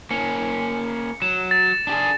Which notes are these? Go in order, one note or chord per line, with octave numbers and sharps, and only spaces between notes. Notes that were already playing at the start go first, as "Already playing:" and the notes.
A#3 C#4 C#7
F#3 E7
A6
D4 G4 G#4